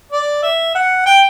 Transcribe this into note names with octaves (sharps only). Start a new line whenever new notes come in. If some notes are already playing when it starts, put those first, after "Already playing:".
D5
E5
F#5
G5